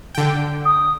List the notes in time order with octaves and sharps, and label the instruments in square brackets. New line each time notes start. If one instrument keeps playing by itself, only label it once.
[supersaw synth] D3 G5
[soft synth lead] D#6